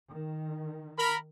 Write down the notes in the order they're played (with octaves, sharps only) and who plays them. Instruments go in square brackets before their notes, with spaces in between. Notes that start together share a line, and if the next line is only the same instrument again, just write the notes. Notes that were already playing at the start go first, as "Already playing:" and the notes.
[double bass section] D#3
[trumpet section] A#4 B5